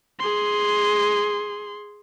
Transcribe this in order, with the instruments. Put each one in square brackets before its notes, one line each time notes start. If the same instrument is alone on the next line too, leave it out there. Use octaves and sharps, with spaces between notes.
[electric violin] G#4 C6